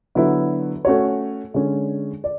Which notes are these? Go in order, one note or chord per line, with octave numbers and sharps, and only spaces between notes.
D3 F#3 B3 E4
A3 C#4 F#4 C#5
D3 G#3 C#4 G#4
D5